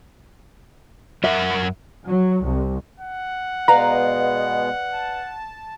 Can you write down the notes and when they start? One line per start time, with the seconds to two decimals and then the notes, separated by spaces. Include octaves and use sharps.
1.24 F#2 A#4 E5 F#5
2.05 F#3
2.43 C2
3.00 F#5
3.68 B2 G#3 B3 B4 D5 F5 A#5
4.93 A5